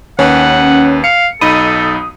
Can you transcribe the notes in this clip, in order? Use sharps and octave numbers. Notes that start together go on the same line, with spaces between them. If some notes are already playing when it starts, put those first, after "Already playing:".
D#2 C#4 B4 F#5
F5 C#7
B1 D#4 A4 B5 D#6